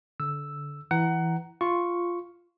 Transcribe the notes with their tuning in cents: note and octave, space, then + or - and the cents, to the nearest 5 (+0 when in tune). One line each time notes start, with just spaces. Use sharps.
D3 -25 E6 +0
E3 +0 F#5 +20 A#5 +0
F4 +0 C#6 +0